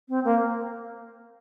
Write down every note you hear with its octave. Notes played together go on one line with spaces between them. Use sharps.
C4
A#3